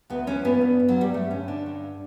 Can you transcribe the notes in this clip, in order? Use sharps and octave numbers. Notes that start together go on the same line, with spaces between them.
D2 B3
E3 C#4
G2 B3
G2
G2
F#3
G2 G3
G2 A3
D3 C#4
D3 D4
G2